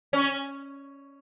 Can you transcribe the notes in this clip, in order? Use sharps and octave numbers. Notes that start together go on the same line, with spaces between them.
C#4